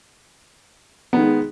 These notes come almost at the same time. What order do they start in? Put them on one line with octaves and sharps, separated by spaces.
B3 D#3 G#3